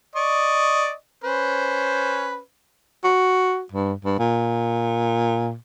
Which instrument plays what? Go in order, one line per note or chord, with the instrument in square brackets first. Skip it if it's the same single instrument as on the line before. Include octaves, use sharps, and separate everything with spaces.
[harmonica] D5 D#5 C#6
C#4 B4 C5
[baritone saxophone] F#4
G2
G2
A#2